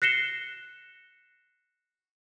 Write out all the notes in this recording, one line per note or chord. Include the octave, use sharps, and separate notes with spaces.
F#6 A#6 C7 C#7 E7 G7